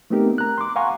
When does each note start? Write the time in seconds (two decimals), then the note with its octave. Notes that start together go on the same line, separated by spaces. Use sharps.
0.10 A3 B3 C4 D#4 G4 A#4
0.38 A#5 F#6
0.58 C6 D6
0.76 F5 F#5 G#5 A#5 C6 C#6